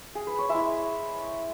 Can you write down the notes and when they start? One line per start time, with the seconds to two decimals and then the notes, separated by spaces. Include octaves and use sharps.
0.15 G#4
0.27 B4
0.39 C#5
0.49 G#3 E4 E5